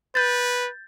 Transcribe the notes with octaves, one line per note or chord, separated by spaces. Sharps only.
B4 G6 A6